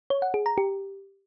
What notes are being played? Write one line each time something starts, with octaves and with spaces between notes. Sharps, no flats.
C#5
F#5
G#4
A#5
G4